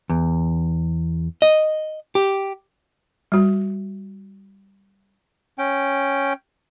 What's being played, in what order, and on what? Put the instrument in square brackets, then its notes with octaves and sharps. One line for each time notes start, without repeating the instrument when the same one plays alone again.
[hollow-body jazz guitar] E2
D#5
G4
[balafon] G3 F#4
[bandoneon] C#4 G5